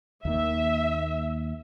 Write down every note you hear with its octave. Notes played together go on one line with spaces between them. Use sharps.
D#2 D#3 A#3 E5